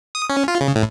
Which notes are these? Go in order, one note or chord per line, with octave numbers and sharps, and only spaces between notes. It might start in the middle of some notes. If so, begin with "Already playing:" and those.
D#6
C#4
F4
C#3
A2